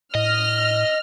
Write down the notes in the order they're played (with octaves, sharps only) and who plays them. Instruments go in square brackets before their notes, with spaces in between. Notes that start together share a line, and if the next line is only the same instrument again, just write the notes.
[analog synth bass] A2 [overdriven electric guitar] D#5 [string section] F6